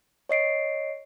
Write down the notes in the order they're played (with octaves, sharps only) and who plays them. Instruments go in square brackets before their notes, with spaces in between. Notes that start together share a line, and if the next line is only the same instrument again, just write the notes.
[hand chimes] C#5 D#5 C7 D7